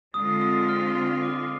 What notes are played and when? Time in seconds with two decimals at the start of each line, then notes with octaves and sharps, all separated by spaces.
0.14 D3 G#3 C4 F4 D#6
0.41 D#6
0.69 F6
1.23 D6